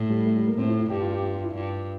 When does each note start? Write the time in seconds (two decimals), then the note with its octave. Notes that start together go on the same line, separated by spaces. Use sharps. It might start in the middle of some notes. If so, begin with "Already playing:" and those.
Already playing: A2
0.09 G3
0.26 A3
0.36 G3
0.46 A#3
0.57 A2 C4
0.68 E4
0.80 E4
0.90 G2 G4
1.00 F4
1.12 G4
1.22 F4
1.34 F4
1.44 E4
1.54 G2 F4